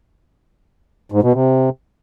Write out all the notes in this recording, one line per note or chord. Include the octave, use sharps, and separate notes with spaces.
G#2
B2
C3